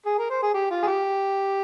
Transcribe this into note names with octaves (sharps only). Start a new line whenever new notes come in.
G#4
A#4
C5
G#4
G4
F4
G#4
G4